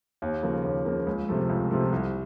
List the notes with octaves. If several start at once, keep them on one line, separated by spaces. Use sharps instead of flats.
D#2
C#3 F3 A#3
D#2
C#3 F3 A#3
C#2
C3 F3 A3
C#2
C3 F3 A3
C2